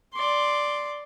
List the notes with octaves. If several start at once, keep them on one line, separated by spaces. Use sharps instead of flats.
D5 C6